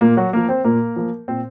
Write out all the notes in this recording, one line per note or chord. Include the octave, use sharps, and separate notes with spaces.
A#2 A#3 A#4
F#3 F#4
F3 A#3 A#4
C4 C5
A#2 A#3 A#4
F3 A#3
A#2 C4 C5